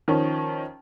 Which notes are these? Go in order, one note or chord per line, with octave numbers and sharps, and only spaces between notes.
D#3 F3 C#4